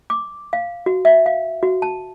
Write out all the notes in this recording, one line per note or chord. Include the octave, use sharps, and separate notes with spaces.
D6
F5
F#4
E5
F5
F#4
A5